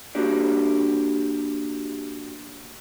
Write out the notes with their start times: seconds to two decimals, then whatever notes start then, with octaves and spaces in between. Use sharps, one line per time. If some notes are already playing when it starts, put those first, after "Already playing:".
0.15 A#3 D4 E4 F#4 G4 D5